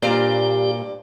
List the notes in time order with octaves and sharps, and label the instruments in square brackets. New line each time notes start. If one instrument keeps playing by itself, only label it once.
[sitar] G2 D5 [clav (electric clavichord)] A#2 [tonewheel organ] G4 [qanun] C5 F5 A#5